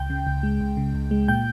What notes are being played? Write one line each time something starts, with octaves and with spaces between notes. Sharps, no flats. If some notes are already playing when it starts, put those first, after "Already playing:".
Already playing: C#2 G5 G6
C#3
C#2
G#3
C#2
C#3
C#2
G#3
A#2 G5 G6